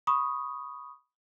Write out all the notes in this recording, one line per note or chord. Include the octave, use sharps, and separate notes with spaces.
B5 C#6 D#6